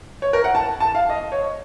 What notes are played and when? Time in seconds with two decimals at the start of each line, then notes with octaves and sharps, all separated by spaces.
0.22 C#5
0.33 A#4
0.44 F#5
0.55 A5
0.80 A5
0.95 F5
1.09 D#5
1.32 C#5